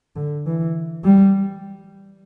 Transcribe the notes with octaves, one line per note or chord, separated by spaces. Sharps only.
D3
E3
G3